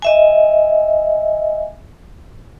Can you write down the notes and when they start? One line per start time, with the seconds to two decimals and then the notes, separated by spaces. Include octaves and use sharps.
0.02 D#5 E5 G#5